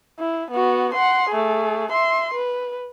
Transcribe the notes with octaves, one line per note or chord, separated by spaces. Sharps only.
E4
B3 F#4
F#5 C6
A3 G#4
E5 C6
B4